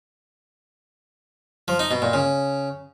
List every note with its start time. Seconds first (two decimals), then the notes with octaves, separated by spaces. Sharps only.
1.68 F3
1.79 D#4
1.91 B2
2.02 A#2
2.13 C#3